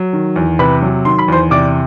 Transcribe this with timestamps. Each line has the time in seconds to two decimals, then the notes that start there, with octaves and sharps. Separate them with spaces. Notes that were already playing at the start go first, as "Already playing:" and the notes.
Already playing: F#3
0.13 D#3
0.36 E2
0.59 C3 B4 B5
0.82 F#3
1.05 D#3 C6
1.19 B5
1.28 E2 C5 C6
1.51 C3 D5 D6